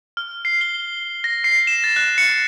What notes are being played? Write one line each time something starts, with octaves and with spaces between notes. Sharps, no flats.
F6
C7
G7
A#6
C7
E7
A6
F#6
C#7